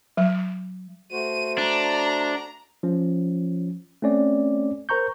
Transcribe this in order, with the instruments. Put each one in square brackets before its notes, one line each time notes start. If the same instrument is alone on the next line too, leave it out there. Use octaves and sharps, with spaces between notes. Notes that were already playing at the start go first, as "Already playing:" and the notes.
[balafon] F#3
[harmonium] A3 F#4 C5 [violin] D#7
[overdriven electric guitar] D4 [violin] A#5
[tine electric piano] F3 C#4
A3 C4 C#4 D5
A#4 C5 A#5 C#6 G6